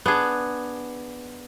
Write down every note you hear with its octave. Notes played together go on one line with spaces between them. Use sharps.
B3 D4 G#4